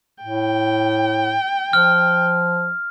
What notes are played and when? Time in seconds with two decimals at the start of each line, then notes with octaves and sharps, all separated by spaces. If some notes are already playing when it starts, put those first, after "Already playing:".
0.24 A2 G5
1.73 F3 F6